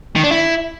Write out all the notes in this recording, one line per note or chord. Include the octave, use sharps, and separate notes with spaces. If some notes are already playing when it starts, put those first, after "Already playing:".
D#3
D4
E4